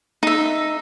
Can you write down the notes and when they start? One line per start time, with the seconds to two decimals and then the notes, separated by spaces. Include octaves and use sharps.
0.23 D#4 E5